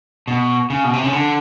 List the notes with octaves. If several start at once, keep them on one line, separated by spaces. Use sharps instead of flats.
B2
C#3
B2
C3
C#3
D3